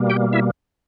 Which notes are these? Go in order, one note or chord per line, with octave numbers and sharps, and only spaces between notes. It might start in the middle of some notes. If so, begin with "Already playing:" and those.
Already playing: B2 G3 A#3
G4 G5
E4 E5